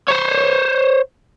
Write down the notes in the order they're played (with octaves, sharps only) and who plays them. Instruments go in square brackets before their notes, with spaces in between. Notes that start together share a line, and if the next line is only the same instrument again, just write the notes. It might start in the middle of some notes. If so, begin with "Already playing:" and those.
[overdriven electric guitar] C5 C#5